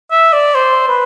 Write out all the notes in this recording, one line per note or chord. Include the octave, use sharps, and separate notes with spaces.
E5
D5
C5
B4